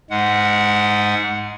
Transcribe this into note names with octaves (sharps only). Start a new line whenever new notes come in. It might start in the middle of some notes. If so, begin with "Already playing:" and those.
G#2 G#3 F#5